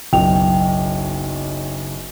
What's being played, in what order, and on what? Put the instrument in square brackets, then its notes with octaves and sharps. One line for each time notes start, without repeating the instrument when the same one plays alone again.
[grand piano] F#1 B1 [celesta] G5 F7